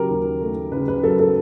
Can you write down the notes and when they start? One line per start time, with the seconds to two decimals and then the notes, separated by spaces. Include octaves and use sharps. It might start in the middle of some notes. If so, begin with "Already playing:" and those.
Already playing: C#3 F#3 G4 A#4
0.09 D#2
0.41 A3
0.72 C#3 B4
0.88 B4
1.03 F#3 A4
1.19 A4